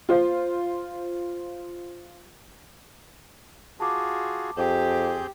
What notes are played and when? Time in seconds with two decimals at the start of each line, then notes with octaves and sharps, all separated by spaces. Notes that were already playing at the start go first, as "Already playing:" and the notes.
0.09 F4 C5
3.80 F4 F#4 G#4 A5 D6
4.57 F2 C4 G4 G#4 G6